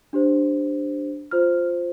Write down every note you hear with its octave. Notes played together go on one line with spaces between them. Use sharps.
D4 G4 C5
F4 C5 F6